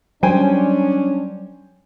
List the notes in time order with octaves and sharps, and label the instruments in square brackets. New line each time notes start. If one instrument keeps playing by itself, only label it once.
[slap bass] F#3 G3 [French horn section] C#4 D4 [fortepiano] C5 G5 G#5